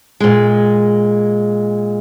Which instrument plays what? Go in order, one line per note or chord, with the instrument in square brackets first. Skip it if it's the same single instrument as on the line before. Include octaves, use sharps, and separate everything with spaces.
[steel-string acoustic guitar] A#2 G#3